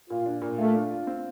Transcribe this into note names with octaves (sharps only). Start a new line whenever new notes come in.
A#2 F4
D4
A#2
A3 F4
D4
F4
C4